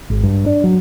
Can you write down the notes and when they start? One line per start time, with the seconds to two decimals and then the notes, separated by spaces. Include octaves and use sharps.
0.10 G#1
0.23 G2
0.46 D4
0.64 F#3